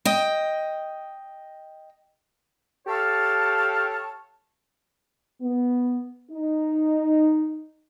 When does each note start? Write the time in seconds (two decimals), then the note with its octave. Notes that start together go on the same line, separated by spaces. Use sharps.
0.05 D#5 G5
2.87 G4 A4 C#5 F5 A5
5.41 B3
6.31 D#4